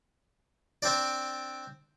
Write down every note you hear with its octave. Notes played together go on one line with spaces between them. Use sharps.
C4 D4 D5